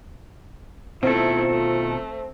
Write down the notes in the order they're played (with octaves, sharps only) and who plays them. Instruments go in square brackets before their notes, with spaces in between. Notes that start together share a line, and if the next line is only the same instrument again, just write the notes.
[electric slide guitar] B2 D#3 A4 [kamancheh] A3 E4 [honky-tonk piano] C4 [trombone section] F4
[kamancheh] A3